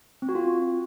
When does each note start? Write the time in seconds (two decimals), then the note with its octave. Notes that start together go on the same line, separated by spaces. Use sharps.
0.22 C4
0.29 F#4
0.35 F4